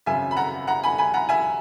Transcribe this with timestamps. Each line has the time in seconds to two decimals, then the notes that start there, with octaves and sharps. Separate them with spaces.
0.06 G#1 F#2 C#3 E5 G#5
0.31 B5
0.36 F#5 A#5
0.67 F#5 A#5
0.84 G#5 B5
0.98 G#5 B5
1.14 F#5 A#5
1.29 E5 G#5